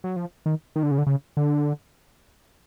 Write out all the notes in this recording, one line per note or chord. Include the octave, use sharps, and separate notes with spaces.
F#3
F3
D#3
D#3
D3
C#3
D3
C#3
D3